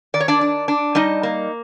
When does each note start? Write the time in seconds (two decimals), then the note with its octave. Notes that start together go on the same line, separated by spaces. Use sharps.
0.14 D#3 D5
0.20 C#5
0.28 D4 D5
0.41 D4
0.68 D4
0.95 G3 D#4 D#5
1.23 A#3